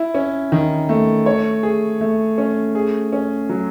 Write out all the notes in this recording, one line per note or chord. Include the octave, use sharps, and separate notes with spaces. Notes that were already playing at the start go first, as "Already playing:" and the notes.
Already playing: E4
C#4
D#3
A3
C#5
G#4
A3
C#4
G#4
C#4
F#3